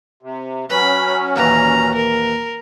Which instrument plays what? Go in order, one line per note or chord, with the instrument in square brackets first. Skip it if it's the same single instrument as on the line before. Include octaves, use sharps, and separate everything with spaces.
[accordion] C3
[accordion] F#3 C#4 [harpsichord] B4 [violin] B5
[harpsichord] D#2 A#2 E3 [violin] A#5
[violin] A#4